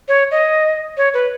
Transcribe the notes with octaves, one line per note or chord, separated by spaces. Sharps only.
C#5
D#5
C#5
B4